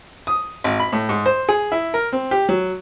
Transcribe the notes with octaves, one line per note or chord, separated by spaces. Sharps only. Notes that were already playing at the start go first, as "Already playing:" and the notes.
D#6
G#1
B5
A2
G#2
C5
G#4
E4
A#4
C4
G4
F#3